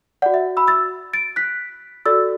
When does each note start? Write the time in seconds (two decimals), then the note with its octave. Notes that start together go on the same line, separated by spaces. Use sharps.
0.22 D5 F#5
0.26 F#4
0.34 E5
0.57 B5 E6
0.68 E6 A6
1.13 A6 D7
1.36 F#6 B6
2.06 F#4 A4 D5 E6 A6